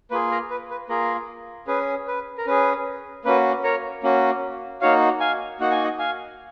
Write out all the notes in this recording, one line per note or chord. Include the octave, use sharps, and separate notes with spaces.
A#3 F4 G#4 B4
A#4
B4
B4
A#3 F4 G#4 A#4
C#4 G#4 B4
B4
A#4
C#4 G#4 B4
A#3 C#4 F#4 B4
A#4 C#5
A#3 C#4 F#4
A#3 D#4 F#4 C#5 F5
F5 G#5
A#3 D#4 F#4 F#5
G#5
D#5 F#5
F5 G#5